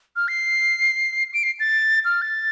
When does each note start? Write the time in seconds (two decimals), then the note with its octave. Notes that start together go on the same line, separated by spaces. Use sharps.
0.16 F6
0.28 C7
1.34 D7
1.43 C7
1.60 A6
2.05 F6
2.22 A6